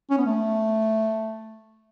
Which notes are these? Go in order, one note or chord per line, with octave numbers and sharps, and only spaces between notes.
C#4
B3
A3